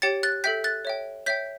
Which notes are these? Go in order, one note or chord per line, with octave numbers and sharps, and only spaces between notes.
G4 C#5 G5 A6 C#7
F#6 A6
A4 E5 G5 G6 B6
F#6 A6
C#5 E5 G5
C#5 E5 G5 G6 B6